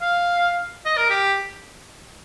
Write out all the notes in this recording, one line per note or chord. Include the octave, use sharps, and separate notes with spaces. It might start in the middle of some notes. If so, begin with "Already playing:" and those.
F5
D#5
A#4
G4